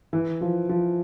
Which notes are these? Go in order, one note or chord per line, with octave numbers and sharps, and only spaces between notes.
E3
F3
F3